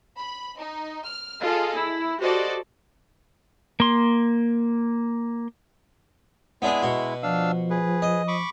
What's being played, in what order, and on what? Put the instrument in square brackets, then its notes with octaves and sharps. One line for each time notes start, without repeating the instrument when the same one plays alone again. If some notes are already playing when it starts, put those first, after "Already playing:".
[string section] B5
D#4
F6
F4 G#4 A4 D#5
E4
F#4 G4 A4 C5 D5 D#5
[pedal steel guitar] A#3 C6
[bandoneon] G#3 E4 [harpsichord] B3 D4 G#4
[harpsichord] B2 F#4
[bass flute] F3 [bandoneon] D4 F5 E6
[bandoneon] G#4 B4
[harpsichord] D#5
[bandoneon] B5 C#6 D6